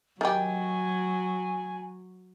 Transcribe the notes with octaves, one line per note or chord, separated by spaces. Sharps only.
D#3 F#3 G4 G#5